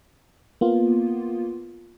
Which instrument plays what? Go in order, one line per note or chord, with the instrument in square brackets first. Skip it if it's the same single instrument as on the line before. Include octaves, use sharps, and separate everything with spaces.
[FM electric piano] A#3 B3 F4